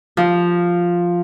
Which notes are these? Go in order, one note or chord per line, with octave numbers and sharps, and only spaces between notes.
F3